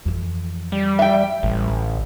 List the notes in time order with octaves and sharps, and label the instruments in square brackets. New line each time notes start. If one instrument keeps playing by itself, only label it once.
[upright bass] F2 E3
[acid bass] G3
[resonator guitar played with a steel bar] E5 G5
[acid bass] A1 [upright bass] G3
[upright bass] D3